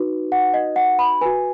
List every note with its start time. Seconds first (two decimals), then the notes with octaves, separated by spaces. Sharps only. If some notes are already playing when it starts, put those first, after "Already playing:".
Already playing: D#4 F#4 B4
0.32 F#5
0.54 D#5
0.76 F#5
0.99 B5
1.21 F#4 B4 G#5